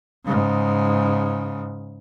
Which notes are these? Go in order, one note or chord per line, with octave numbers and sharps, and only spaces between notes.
G#2 C#3